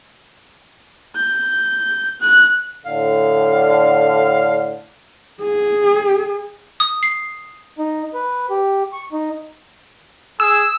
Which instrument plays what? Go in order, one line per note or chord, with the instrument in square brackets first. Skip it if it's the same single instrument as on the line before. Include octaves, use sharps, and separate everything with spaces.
[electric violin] G6
F#6
[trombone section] A2 D3 [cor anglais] F5
[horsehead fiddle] G#4
[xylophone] D#6
C7
[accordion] D#4
B4
G4
C#6
D#4
[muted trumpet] G#4 [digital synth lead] E6